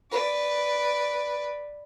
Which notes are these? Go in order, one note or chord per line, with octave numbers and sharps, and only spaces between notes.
B4 D5